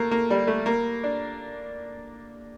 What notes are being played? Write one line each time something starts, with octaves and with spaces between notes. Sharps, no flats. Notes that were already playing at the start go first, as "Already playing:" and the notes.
Already playing: A3 A#3
A#3
G3
A3
A#3
D4